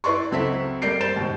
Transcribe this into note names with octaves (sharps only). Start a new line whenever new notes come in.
E4 B4 D5 C6 C#6
C#2 F#3 C4 A4 E5 B6
G3 A#3 D5 G6 C7 D7
C5 G6 A6 E7
D#2 G#2 B2